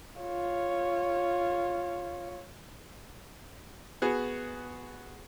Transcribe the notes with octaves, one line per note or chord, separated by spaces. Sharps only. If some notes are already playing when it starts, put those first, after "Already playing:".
F4 C#5
B3 F#4 G#4